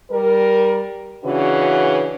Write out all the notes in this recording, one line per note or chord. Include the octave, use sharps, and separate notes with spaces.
G3 A#4
C#3 E3 D4 F#4 B4